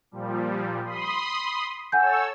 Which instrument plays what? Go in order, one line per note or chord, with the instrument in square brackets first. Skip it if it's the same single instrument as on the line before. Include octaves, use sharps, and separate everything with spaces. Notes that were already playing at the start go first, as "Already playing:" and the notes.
[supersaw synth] A#2 F3 G3
B5 C6 D#6
[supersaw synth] A4 C#5 E6 [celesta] F#5 G#5 G6